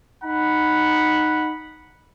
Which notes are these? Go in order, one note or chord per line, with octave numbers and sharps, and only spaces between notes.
D#4 F#5 B5